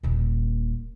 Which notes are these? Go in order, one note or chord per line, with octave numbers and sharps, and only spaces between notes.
D#1 A#2